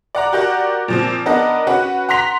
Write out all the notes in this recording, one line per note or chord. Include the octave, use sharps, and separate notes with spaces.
D5 F#5 A#5
F#4 G4 A#4 D5 F#5
A#2 F3 C4
B3 D4 A#4 D#5 F#5
C#4 F#4 B4 F#5
F#5 A#5 C6 B6 F7